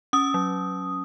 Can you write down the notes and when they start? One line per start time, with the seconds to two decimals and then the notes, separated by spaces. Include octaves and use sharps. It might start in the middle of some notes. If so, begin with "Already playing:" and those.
0.13 C#4 D#6
0.34 F#3